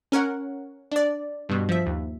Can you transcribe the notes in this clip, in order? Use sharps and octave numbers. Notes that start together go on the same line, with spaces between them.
C#4 A#4 C#5 F#5
D4 D5
G2 B2
F3 E5
D#2